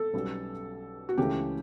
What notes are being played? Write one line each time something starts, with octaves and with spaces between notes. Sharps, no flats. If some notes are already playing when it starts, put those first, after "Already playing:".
Already playing: A4
B1 B2 G3 C#4
F#4
C#2 C#3 E3 A3 C#4 G4